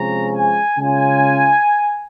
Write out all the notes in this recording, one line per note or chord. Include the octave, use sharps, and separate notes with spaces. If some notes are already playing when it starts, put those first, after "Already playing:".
Already playing: C3 F3 G#3 C#4 A#5
G#5
C#3 G#3 C#4 F4 G#5